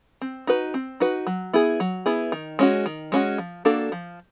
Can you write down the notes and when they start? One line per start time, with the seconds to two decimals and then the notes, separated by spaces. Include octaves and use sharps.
0.21 C4
0.47 D#4 F#4 B4
0.74 C4
1.00 D#4 F#4 B4
1.27 F#3
1.53 B3 E4 G#4
1.80 F#3
2.06 B3 E4 G#4
2.32 D#3
2.59 G#3 C#4 F#4
2.86 D#3
3.12 G#3 C#4 F#4
3.38 F3
3.65 A#3 D4 F#4 A4
3.92 F3